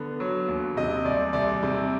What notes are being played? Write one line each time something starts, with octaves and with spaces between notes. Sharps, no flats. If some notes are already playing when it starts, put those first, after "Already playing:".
Already playing: D3 B3
F#3
D#2
C3 D#5
C2 D5
C2 D5
C3